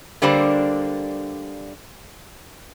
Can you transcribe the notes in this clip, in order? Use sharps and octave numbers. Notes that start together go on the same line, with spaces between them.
D3 G3 A#3 D4 C5